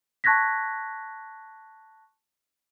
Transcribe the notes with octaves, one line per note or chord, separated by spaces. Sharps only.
A5 C#6 F#6 G#6 A#6 B6